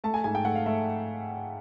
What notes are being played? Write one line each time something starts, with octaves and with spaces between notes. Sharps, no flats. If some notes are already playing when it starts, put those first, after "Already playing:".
A3 A5
G#5
G#2 G#5
G5
A3 F#5
F5
A3 E5